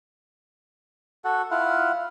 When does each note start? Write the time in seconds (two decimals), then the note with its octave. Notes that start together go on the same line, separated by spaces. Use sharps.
1.25 F#4 A4 F#5
1.51 E4 F4 F5 F#5